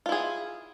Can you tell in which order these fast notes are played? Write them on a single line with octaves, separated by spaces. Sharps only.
F4 E4 G#4